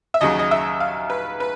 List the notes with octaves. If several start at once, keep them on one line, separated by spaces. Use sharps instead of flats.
E5
D#2 C#3 F#3 D#5
D#5
E5
F5
B4
B4